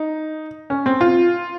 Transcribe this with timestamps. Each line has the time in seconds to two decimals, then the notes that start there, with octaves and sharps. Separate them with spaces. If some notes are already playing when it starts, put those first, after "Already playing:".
Already playing: D#4
0.70 C#4
0.86 C4
1.01 F4